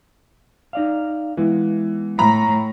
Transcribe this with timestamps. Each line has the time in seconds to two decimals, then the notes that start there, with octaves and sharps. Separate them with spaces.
0.73 D#4 D5 F5
1.37 E3 G#3 B3
2.19 A2 A#5 B5